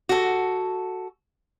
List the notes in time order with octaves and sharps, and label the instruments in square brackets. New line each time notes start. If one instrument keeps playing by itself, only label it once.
[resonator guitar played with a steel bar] F#4 A4